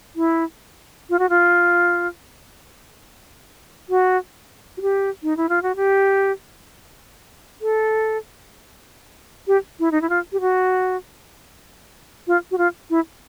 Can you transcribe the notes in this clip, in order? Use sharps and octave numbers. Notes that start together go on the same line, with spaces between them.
E4
F4
F#4
F4
F#4
F#4
G4
D#4
E4
F4
F#4
G4
A4
G4
E4
D#4
E4
F4
G4
F#4
F4
F#4
F4
E4